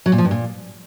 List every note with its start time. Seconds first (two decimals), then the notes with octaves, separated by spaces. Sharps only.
0.06 F#3
0.12 A#2
0.18 F3
0.25 G2
0.31 A#2